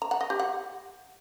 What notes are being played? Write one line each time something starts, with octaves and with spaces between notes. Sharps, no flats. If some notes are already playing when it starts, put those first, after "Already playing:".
A#5
F#5
D#5
G4
F#5